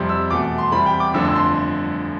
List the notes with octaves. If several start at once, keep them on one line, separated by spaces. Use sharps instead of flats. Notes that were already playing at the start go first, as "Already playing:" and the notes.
Already playing: F2 C3 G3 C6
E6
E2 B2 A3 D6
C6
E2 C3 G3 B5
G5
D6
G1 F2 D3 F3 A3 E6
E6
C6